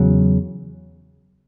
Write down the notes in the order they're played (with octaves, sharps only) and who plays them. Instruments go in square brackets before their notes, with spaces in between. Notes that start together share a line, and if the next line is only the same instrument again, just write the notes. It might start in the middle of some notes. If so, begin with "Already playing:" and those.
Already playing: [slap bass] E2 C#3 F#3